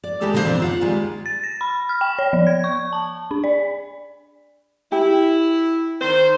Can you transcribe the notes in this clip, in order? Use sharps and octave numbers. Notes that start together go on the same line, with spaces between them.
D5
E3 G#3 E4 G4 A4 D5
D3 E3 A#3 C#4 C5 D5
B2 D#3 F3 G3 C4 D4
D#2 F4 F#5
D#3 G3 G#3 B3 F4
A6
A#6
B5
F6
G5
C#5
F3
G#6
C#6
A5
D4
D5
E4 G4
D#3 C5